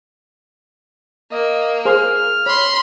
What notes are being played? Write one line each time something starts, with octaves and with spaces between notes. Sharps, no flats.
A#3 D#5
G#4 C5 C6 F6
C#5 B5 C6